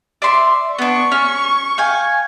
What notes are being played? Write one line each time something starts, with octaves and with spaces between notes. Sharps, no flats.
D5 E5 C6
B3 D4 C#6
C#4 F6
F5 G5 G#5